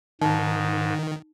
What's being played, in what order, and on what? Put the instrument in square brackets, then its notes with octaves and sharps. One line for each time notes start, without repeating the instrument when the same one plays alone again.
[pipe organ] G#2 [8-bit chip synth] D#3 [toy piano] D#4